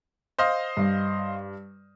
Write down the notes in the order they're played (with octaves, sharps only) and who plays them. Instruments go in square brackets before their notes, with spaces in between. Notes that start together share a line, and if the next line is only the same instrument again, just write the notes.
[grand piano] C5 D#5 F5
[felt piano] G2